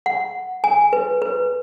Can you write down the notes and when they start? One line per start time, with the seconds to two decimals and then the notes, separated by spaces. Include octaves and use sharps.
0.06 F#5
0.64 G#5
0.93 B4
1.22 B4